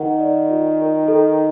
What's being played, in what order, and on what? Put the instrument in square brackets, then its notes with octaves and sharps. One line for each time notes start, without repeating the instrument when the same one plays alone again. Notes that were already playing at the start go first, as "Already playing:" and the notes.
Already playing: [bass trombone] D#3 [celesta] F#5
[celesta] D5
F4
A#4
A4